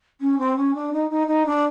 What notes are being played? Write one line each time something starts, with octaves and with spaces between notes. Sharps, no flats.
C#4
C4
C#4
D4
D#4
D#4
D#4
D4